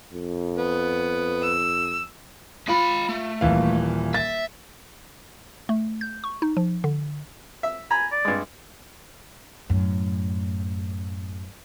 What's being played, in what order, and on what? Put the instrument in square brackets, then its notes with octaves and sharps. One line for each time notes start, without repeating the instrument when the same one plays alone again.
[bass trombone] F2
[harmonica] B3
[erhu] E6
[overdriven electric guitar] G#3 B5 [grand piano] F4
[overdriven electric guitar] A3
[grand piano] D#1 E3 F5
[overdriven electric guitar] E5 [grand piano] A6
[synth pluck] A3
G6
C#6
D#4
F3
D3
[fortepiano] E5
[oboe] G#5 [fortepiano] A#5 B5
[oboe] D5
[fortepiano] G2 G#3
[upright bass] F#2 A2